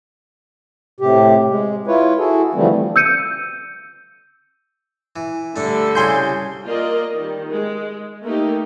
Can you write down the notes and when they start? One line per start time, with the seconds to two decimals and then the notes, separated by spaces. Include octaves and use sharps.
1.01 A2 C3 G4
1.50 G#3
1.87 E4 F4 B4 C#5
2.18 E4 F#4 G#4 A4
2.55 D3 E3 F3 G3 A3 C4
2.96 E6 G6 C#7 D#7
5.16 E3
5.56 D3 G3 A3 D4 A4
5.95 C2 C#3 G#5 C6 D6 G6
6.66 A#3 F4 A#4 D5 D#5
7.15 D#3 G3
7.53 G#3
8.25 A3 A#3 D#4 G4 A#4